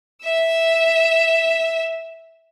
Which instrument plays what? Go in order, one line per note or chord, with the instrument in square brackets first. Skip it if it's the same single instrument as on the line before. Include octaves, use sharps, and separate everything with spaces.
[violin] E5 E6